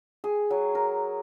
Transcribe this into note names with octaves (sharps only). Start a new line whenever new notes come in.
G#4
F#3
A#4